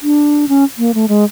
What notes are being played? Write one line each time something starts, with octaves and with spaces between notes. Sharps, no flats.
D4
C#4
A#3
A3
G#3